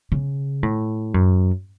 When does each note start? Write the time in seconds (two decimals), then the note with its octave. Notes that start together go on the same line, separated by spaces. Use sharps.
0.12 C#3
0.63 A2
1.14 F#2